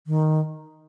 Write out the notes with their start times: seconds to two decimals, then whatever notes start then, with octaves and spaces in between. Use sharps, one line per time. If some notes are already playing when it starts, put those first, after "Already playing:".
0.07 D#3